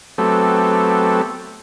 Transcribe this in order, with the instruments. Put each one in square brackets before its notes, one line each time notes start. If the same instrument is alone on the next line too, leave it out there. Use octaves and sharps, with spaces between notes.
[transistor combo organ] F#3 A3 B3 C4 G4 A4